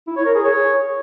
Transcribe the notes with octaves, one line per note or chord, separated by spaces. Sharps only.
E4
C#5
A#4
G#4
C#5